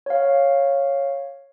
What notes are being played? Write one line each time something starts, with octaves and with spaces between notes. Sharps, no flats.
C#5 F5